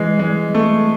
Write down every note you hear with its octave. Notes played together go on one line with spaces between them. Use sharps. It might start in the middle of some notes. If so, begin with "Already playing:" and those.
Already playing: E3 G#3
G#3
A3